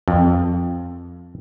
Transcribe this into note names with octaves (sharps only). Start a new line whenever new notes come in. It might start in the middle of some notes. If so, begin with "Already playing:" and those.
F2